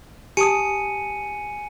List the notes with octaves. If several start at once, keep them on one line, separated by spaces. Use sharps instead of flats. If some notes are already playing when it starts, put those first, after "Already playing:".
G4 G#5 A5 D#6 C#7 D#7